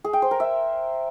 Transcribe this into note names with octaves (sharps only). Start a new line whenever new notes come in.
G#4
G5
C5
A#4
E5